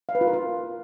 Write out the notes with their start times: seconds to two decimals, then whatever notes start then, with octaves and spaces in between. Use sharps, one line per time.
0.09 F5
0.15 B4
0.21 F4
0.27 A#4
0.33 F4